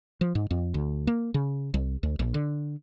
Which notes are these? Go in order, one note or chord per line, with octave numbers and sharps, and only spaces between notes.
F3
G#2
F2
D2
A#3
C#3
C2
D2
A#1
D3